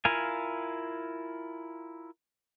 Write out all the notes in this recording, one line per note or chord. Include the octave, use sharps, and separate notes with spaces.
E4 F4 A#4 F5 G#5